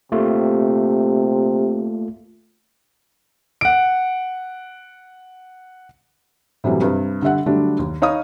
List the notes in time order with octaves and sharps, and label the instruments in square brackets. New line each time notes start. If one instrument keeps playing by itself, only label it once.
[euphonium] C3 [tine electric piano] A3 A#3 F4
[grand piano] F#5 D7
[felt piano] A2 C3 E3 F#3 G3
G2 C3
D3 G3 E5 F#5
D3 F#3 G3 A3 D4
D#2
D#4 C#5 F5 B5 D#6